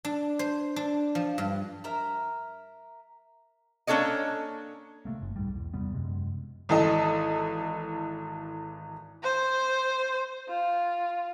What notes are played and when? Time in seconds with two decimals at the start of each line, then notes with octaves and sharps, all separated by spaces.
0.05 D4
0.39 C5
0.76 D4
1.15 F3
1.38 G2
1.84 A#4 E5 A#5
3.87 A#3 C#4 D4 A4 C#5 D#5
5.05 C3 A3 A#3
5.21 F#1
5.36 B1 G#2 G3
5.54 E2
5.74 E2 C3 G3 B3
5.94 F#2 C3 G#3
6.69 G#1 E3 A4 D#5
9.23 C5
10.49 F4